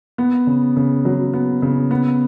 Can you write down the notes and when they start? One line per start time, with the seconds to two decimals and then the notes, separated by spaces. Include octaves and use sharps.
0.18 B3
0.47 C#3
0.76 C#3
1.05 F#3
1.33 B3
1.62 C#3
1.91 B3